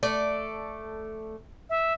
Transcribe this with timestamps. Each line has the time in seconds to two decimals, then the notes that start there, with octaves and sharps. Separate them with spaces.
0.03 A3 A4 D5
1.70 E5